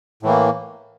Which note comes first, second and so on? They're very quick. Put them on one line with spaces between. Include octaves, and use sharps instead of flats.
A2 E3 A#3